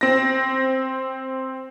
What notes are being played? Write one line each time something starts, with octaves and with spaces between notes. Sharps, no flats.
C4 A#6